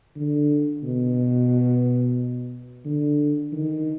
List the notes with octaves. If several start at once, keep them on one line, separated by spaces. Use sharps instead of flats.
D3
B2
D3
D#3